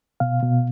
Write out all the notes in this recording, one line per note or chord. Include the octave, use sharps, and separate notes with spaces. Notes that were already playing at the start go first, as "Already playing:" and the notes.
B2 F5
B2